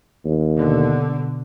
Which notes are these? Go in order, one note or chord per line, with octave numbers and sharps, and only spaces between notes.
D#2
B2 D3